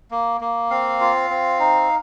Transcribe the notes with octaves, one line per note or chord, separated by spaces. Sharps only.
A#3
A#3
C4 F5
F4
C4
D#4